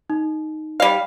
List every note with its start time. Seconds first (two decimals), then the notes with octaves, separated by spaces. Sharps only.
0.10 D#4
0.80 G3 F5